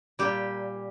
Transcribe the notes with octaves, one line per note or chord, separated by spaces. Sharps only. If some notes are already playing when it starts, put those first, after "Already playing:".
A#2 G3 G4